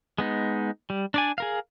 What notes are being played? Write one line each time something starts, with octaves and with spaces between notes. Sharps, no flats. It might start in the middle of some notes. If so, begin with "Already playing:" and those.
G#3 B3 D#4
G3
D4 D5 G#5
G#4 A#4 F5